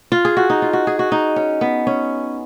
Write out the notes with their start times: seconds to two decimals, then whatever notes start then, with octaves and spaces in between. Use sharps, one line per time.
0.12 F4
0.25 G#4
0.37 F#4
0.50 D#4
0.62 F4
0.73 F#4
0.87 G#4
0.99 F#4
1.12 D#4
1.36 C#4
1.61 B3
1.87 C#4